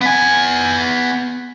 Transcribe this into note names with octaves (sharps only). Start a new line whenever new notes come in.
B3 G#5